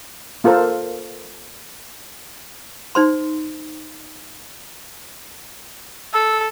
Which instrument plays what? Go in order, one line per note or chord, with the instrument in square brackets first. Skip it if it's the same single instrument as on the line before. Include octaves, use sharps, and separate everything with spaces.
[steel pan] A#3 F4 A4 A#4 C5
[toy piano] D#4 C5 C6
[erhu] A4 [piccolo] E6